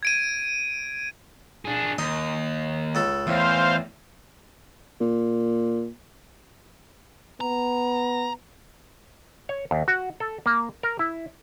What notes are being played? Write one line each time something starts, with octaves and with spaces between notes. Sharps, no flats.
G#6 D7 D#7
D4 G#4
D#2 D#4 C6
C#2 A4 B5
E2 A2 C5 F5
A#2
B3 A#5
C#5
D#2
F#4
A4
A#3
A#4
E4